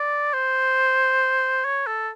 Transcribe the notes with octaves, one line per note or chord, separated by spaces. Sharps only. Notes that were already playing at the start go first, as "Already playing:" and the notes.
Already playing: D5
C5
C#5
A4